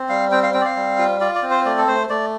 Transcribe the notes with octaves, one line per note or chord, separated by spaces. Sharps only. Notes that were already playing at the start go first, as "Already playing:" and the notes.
Already playing: C4
G3 F5
C4 G5
F5
C4 G5
D5
F5
G3
F4
F4 D5
D5
C4
C5
A3 D5
A4
A3 C5
A3 D5